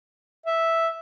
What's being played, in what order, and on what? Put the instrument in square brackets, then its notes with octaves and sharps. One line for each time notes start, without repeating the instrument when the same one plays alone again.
[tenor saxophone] E5